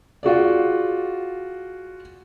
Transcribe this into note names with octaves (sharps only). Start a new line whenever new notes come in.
F4 F#4 G#4 D5